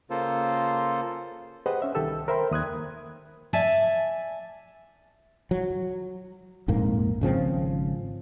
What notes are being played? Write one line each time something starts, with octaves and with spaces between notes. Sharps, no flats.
C#3 A#3 F4 A4 C5
G4 G#4 B4 C5 D#5 F#5
C#4 E5
C2 D#3 G4 A4 E6
A#4 C5 E5 G5 B5 C6
D#2 D#6 F#6 G#6
D5 E5 G#5 A5
F#3
A#1 F2 G#2 A#3
G#1 C#3 F3 C4